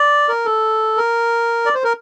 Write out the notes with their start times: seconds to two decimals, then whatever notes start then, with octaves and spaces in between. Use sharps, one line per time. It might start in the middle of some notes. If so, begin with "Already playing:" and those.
Already playing: D5
0.29 A#4
0.45 A4
0.97 A#4
1.66 D5
1.75 C5
1.84 A#4